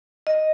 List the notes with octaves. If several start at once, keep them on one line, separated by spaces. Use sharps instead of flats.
D#5